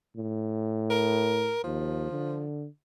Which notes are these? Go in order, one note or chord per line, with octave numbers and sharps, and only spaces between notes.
A2
A#4
D#2 F3
D3